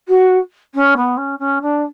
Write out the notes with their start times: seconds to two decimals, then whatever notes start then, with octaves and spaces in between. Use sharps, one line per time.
0.09 F#4
0.75 C#4
0.97 B3
1.17 C#4
1.39 C#4
1.62 D4